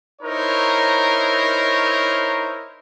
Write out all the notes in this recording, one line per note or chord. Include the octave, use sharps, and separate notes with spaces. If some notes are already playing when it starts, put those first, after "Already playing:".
D#4 E4 A#4 C5 C#5